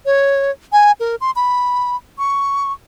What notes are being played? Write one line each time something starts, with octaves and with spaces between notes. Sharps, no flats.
C#5
G#5
A#4
C6
B5
C#6